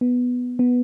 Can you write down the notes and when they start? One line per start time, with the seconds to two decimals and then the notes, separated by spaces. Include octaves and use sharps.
0.01 B3
0.59 B3